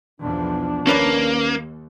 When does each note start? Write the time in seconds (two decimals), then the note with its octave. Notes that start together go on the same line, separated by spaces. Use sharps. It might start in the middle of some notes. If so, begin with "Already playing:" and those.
0.21 B1 E2 F3 D4
0.87 D#2 A#3 C#4 B4 D5